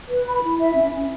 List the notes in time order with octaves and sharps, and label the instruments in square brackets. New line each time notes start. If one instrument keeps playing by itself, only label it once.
[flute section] B4
B5
E4
E5
C#4
C#4